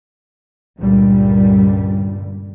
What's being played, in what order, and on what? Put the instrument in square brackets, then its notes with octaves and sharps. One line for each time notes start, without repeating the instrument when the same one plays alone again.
[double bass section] C#2 G2 A#2 D3 G3